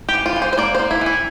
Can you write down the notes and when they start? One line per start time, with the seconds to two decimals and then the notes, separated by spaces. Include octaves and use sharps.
0.09 G4
0.14 E3
0.26 F4
0.36 E3
0.42 C5
0.53 C5
0.58 A#3 D5
0.75 A#3 C5
0.91 E4
1.01 E3
1.06 E4